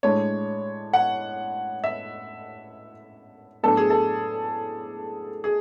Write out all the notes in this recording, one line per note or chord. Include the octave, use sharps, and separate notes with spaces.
A2 G#3 D4 C#5
F#5
E5
A2 F#3 B3 D4 A4
G#4
A4
G#4